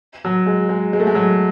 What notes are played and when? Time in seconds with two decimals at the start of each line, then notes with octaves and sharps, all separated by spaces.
0.25 F#3
0.46 G#3
0.69 G#3
0.93 G#3
1.00 A3
1.07 G#3
1.15 F#3